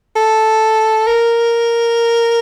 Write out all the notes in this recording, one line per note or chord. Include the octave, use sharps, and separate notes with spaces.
A4
A#4